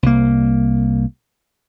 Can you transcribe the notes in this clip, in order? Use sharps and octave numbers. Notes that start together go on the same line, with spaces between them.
C2 A#3